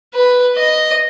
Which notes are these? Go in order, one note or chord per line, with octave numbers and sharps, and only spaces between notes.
B4
D#5